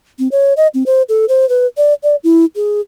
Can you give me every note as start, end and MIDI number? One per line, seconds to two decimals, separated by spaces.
0.19 0.28 60
0.31 0.53 73
0.57 0.67 75
0.74 0.83 60
0.86 1.02 72
1.09 1.25 69
1.29 1.48 72
1.49 1.66 71
1.77 1.93 74
2.03 2.16 74
2.24 2.45 64
2.56 2.81 68